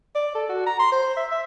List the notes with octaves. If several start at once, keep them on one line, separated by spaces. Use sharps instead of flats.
D5
A4
F#4
A#5
C6
C5
E5
E5